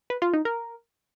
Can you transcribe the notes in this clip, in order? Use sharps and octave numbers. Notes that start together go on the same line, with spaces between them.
B4
F4
D#4
A#4